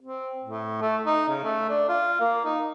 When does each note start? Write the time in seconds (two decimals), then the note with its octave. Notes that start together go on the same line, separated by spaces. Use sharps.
0.01 C4
0.44 A2
0.81 A3
1.06 D#4
1.29 C#3
1.44 A3
1.69 D4
1.89 F4
2.20 A#3
2.44 D#4